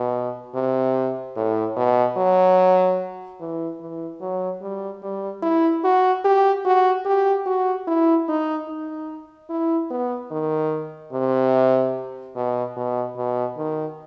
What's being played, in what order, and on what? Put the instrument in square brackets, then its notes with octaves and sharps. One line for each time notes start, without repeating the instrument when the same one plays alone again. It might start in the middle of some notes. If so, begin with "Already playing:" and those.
Already playing: [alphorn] B2
C3
A2
B2
F#3
E3
E3
F#3
G3
G3
E4
F#4
G4
F#4
G4
F#4
E4
D#4
D#4
E4
B3
D#3
C3
B2
B2
B2
D#3